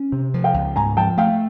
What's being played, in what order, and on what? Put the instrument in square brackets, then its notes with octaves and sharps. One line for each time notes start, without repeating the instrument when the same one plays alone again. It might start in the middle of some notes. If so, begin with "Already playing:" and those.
Already playing: [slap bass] C#4
C3
F3
[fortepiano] F5 G5
[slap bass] C#2
[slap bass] G#2 [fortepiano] G#5 A#5
[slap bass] F3 [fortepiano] G5 A5
[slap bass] A3 [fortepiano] F5 G5